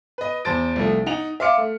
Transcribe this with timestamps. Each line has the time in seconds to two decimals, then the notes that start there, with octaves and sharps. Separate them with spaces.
0.18 B4 D#5
0.45 E2 C5 A5 A6 D7
0.76 C2 F3 A3
1.06 D#4 F#5 F7
1.40 E5 F5 C6 D6 F6 C#7
1.58 A3